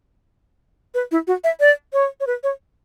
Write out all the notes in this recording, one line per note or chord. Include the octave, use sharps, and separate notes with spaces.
B4
E4
F#4
E5
D5
C#5
C#5
B4
C#5